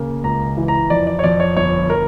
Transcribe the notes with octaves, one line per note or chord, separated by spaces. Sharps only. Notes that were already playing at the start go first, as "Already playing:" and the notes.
Already playing: C#3 A#3
C#2 A#5
E3
A#5
F2 D5
D5
C#5
F2 D5
C#5
G1 C#5
A#4